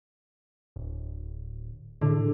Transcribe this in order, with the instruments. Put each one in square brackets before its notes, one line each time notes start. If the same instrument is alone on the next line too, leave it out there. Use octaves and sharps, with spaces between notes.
[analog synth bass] D1
[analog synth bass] A2 [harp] D3